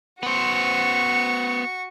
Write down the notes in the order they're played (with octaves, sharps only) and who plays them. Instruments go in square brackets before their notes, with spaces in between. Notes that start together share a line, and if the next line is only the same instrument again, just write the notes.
[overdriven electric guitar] B3 C5 [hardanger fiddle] F#4 C#6